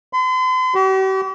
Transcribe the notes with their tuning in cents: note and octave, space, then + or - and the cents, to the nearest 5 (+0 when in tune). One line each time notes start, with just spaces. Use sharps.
C6 -45
G4 -45